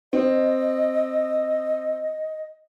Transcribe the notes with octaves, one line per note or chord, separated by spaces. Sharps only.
C4 D#5